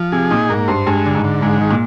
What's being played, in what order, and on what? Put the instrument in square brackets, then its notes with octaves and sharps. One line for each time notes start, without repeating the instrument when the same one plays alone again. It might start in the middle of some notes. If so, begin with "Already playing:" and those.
Already playing: [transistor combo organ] F3
[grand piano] C3 [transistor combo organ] G#4
[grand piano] A#2 [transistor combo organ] D#4
[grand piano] G#2 [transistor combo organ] A#3
[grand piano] G2 [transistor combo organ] C5
[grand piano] G2 [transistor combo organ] G#3
[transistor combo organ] D3
[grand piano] G#2
[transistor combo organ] D3
[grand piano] G#2 [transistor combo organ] G#3
[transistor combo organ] D#3
[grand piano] A#2